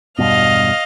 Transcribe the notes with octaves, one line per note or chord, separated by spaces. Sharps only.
E1 G2 B2 D#5 F5 F6